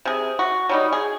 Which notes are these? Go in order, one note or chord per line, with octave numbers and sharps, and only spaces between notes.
C3 G#4
F#4
F#3 G3 D#4
G#4